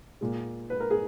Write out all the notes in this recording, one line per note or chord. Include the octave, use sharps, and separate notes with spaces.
A#2 G#3
B4
A#4
G#4